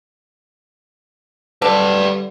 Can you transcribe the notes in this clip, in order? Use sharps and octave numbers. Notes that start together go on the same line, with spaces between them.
D3 G3 B4 D5